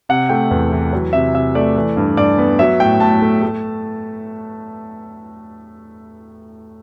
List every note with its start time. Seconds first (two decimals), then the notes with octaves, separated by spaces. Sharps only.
0.09 C3 F#5
0.29 A3 G5
0.51 E2
0.72 E3
0.93 F#3
1.13 C3 E5
1.34 C3 E5
1.55 A3 D5
1.76 E3
1.97 G2
2.17 G2 D5
2.38 B3
2.59 F#3 E5
2.80 A2 G5
3.00 A2 A5
3.22 A3
3.42 A3